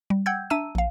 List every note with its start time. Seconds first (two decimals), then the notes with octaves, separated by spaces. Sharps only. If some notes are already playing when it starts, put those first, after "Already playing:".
0.10 G3
0.26 F#5 G5 E6 G6 G#6
0.50 D4 E5 A5 A#5 E6 D#7
0.75 A#1 F5